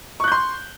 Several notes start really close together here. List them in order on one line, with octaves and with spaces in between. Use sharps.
C#6 F#6 G6 C6